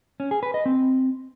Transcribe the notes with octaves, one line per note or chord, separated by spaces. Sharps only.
C#4
G#4
B4
D#5
C4